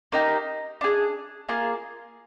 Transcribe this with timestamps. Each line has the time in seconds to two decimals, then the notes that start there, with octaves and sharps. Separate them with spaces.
0.12 A#3 D#4 G4
0.81 D4 G#4
1.49 A#3 F4 G#4